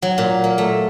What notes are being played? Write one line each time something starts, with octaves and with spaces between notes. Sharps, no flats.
F#3
A#2
A#3
A3